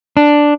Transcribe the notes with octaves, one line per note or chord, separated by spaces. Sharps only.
D4